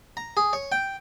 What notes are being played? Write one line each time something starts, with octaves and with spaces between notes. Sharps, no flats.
A#5
G#4
C#5
G5